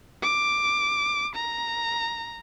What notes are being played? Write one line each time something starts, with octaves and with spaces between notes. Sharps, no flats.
D6
A#5